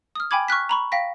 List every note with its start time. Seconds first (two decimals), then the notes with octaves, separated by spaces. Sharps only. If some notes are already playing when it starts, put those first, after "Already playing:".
0.15 D#6 F6
0.31 G5 G#5 B5 D6 G#6
0.48 C#6 F6 F#6 B6
0.69 A#5 B5 C#6
0.92 F5 G5 A#6 B6